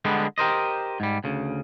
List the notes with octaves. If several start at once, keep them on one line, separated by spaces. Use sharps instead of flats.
D3 G3 G#3 B3
G4 A#4 C5 D#5
G#2 G3
D2 C#3